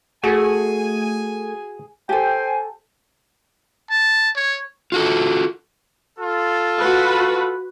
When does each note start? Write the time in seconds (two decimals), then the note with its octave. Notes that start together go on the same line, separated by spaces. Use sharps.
0.24 A3 F#4 G#4 G#5
2.09 G4 A4 C5 G5 G#5
3.90 A5
4.36 C#5
4.92 F4 F#4 A4
6.19 F4 A4
6.80 F#4 B4